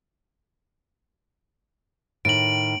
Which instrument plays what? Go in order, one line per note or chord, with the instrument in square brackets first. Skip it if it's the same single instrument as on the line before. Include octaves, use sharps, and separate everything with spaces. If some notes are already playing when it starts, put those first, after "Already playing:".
[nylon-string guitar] A2 D#3 [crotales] D7 F#7